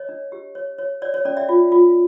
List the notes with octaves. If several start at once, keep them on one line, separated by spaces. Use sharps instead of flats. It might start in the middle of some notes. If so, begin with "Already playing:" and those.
Already playing: C#5 D#5
D4
G4
C#5
C#5
C#5 D5
C#5
C#4 D5
D5 E5
F4
F4